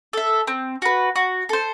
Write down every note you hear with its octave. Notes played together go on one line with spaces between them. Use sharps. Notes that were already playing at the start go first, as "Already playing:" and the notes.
A4 E5
C4
F#4 B4
F#4
A4 C5